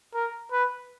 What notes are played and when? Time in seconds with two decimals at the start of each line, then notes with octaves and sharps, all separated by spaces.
0.14 A#4
0.52 B4